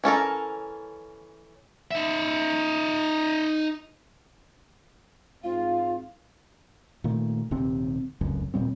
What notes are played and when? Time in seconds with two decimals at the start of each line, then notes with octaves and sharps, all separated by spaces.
0.04 E3 C#4 A4 A#4
1.91 D#4 E5
5.44 G#2 C4 F4 F5
7.04 A#2 D#3 A3
7.51 D#1 D#2 C3 C4
8.21 F1 C#2 F#2
8.54 D#1 A#2 G3 C4